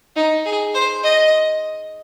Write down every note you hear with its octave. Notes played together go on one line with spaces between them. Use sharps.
D#4
G#4
C5
D#5